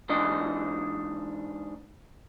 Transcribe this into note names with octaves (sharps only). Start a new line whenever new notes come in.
G#2 E3 D4 D#5